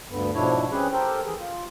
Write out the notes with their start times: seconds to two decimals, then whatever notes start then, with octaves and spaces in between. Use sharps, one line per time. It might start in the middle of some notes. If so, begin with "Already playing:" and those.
0.10 D2 G2 D3 B3
0.35 G#2 B2 F3 D4 E4 C#5
0.71 C4 C#4 G4 G#4 B4
0.92 G4 A4 A#4 C5 G5
1.26 E3 G#4
1.38 F4